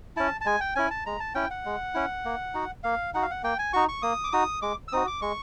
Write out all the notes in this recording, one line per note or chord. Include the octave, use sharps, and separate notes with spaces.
C#4 E4 A5
A5
G#3 G#5
G5
C#4 E4 G#5
A5
G#3 A#5
A5
C#4 E4 G5
F#5
G#3
C#4 E4
A#3
D#4 F#4
A#3 F5
D#4 F#4 F#5
F5
F#5
A#3 G5
G#5
D#4 F#4 C#6
C#6
A#3 D#6
D6
D#4 F#4 D#6
G#3 D6
E6
C4 D#4 F#4 D#6
D6
G#3 C#6